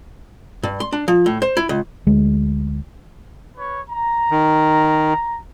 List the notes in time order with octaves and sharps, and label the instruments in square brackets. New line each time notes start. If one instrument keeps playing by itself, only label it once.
[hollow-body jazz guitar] G2
C6
D4
F3
A2
C5
E4
C#2
[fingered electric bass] D2 G#3
[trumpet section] B4 C#5
A#5
[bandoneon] D#3